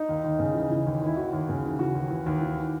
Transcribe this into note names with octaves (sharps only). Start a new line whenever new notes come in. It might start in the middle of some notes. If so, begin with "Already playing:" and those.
Already playing: D#4
D#2
D#2
C#3
E3
E3
D#2
D#2 E4
D#2 F#4
D#2
C#3
E3
E3 F#4
D#2
E3
D#2
E3